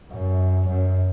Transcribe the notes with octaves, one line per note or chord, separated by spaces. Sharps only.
F#2
F#2